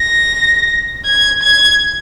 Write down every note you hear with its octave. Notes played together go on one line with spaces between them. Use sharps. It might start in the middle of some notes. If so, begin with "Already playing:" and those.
Already playing: A#6
G#6
G#6